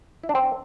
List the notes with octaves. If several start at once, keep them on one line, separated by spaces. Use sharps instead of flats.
E4
D4
C4